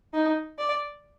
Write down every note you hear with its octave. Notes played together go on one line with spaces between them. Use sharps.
D#4
D5